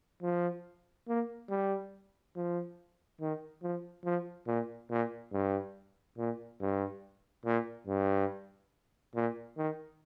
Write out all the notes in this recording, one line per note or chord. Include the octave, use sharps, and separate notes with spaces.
F3
A#3
G3
F3
D#3
F3
F3
A#2
A#2
G2
A#2
G2
A#2
G2
A#2
D#3